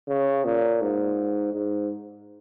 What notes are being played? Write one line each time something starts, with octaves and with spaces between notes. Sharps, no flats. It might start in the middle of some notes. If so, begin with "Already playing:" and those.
C#3
A#2
G#2
G#2